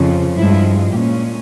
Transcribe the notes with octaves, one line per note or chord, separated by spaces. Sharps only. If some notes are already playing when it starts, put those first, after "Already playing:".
Already playing: F2 C#3 F3
G2 F3 G#3 E4
A#2 G#3 C#4 G4